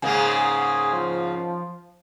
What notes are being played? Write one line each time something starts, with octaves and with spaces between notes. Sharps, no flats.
G#2 C#3 A#3 G#4
F3